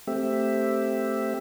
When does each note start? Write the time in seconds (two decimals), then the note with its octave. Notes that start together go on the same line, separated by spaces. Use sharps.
0.07 A3 C4 G4 E5